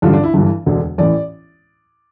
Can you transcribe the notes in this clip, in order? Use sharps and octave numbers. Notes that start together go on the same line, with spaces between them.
A1 G2 D3 F4
D4
E4
G1 G2 E3
E1 D2 D3
A1 A2 E3 D5